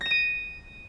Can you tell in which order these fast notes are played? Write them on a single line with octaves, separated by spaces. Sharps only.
A#6 E7 D#7